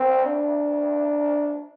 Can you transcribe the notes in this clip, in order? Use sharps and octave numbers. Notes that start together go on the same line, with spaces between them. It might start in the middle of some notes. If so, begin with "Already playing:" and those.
Already playing: C4
D4